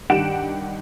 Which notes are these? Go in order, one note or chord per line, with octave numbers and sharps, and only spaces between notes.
G2 D#3 G4 F#5 D7 E7